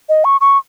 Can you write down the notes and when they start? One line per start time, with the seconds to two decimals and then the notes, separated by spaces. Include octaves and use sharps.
0.09 D#5
0.25 C#6
0.41 C#6